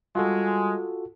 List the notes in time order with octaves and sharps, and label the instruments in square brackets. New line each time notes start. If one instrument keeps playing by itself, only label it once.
[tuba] G3 [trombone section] G#3 [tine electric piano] F4 F#4 A4